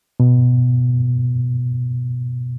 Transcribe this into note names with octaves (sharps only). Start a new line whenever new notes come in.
B2